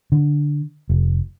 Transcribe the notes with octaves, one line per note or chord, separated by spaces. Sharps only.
D3
F1